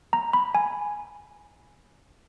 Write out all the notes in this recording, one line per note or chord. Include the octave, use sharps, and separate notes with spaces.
A#5
B5
G#5